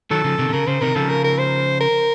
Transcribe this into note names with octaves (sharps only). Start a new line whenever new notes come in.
D#3 F#3 A4
C#3 F3
C3 D#3
C3
C#3 A#4
C#3 C5
C3 D#3 A#4
C#3 F3 A4
A#4
A#4
C5
A#4